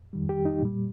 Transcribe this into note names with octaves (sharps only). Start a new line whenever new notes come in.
F2 D#3 G3
G4
D#4
A#2 G3